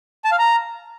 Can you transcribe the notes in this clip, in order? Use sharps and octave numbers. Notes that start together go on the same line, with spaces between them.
A5
F5
A#5